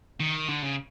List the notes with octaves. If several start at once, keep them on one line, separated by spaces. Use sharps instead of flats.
D#3
D3
C#3